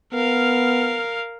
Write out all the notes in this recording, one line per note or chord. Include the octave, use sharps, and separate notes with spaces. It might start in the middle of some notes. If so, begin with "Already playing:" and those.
B3 A#4 F5